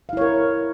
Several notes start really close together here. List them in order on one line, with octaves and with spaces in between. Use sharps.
F5 E4 C#5 A#4